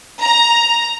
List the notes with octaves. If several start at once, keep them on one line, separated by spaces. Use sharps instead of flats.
A#5